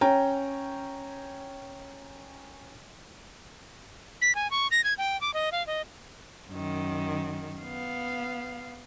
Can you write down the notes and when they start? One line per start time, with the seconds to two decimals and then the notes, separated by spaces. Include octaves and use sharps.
0.01 C#4 G5 A#5
4.22 B6
4.35 G#5
4.51 C#6
4.71 A#6
4.84 G#6
4.98 G5
5.21 D6
5.34 D#5
5.52 F5
5.67 D#5
6.50 F#2 D#3
7.61 B3 F5